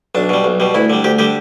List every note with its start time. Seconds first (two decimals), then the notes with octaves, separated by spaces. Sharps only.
0.15 B1 D4
0.29 B2 G3
0.44 B1
0.60 B2 G3
0.74 D2 E4
0.90 D3 G3
1.04 D2 G4
1.19 D3 G3 G4